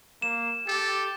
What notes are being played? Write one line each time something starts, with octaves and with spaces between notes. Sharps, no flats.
A#3 E7
G4 A4